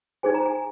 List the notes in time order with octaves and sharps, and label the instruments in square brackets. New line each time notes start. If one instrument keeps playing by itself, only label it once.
[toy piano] D#4 G#4 C5 G#5
A#5
G#5